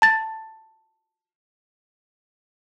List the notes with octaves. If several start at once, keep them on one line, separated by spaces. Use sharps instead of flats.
A5 A6